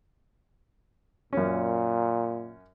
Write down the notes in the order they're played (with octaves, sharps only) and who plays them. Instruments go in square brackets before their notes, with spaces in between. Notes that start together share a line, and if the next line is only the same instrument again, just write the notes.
[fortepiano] F#2 C#4 [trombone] A#2